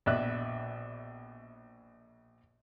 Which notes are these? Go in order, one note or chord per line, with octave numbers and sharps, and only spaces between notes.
A#1 B2 D5 E5 F#6